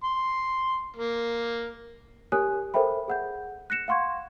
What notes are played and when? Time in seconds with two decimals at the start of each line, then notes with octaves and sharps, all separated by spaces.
0.04 C6
0.96 A#3
2.32 G4 A#4 C#5 G#5 D#6 F#6
2.74 A4 A#4 C5 E5 G5 B5
3.08 G#4 F#5 G6
3.70 F#6 A#6 C#7 E7
3.88 F5 F#5 C6 C#6 G#6